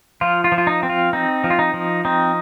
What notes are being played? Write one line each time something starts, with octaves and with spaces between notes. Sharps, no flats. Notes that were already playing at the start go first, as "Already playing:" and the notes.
F3 F4
F4
F3
F4
D#4
C4
F4
C4 D#4
F3
F4
D#4
F3
C4 D#4